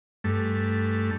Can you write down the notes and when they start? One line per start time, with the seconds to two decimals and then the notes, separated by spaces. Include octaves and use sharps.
0.24 G2 A3